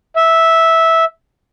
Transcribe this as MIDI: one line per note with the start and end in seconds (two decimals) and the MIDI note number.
0.16 1.04 76